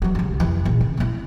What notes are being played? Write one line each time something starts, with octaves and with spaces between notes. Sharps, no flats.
E3 F#3
C2 C#3
F1 E3
A#1 A#3
C#3
A#3 E4